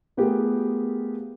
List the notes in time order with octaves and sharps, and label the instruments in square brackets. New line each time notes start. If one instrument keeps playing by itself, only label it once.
[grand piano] A3 B3 F4 G4 G#4 A#4